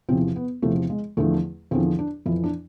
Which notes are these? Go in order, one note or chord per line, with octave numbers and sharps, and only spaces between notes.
E2 C3 F3 C4
B3
E2 C3 F3 A3
G#3
E2 D3 F3 A3
E2 D3 F3 C4
D4
F2 E3 E4
D4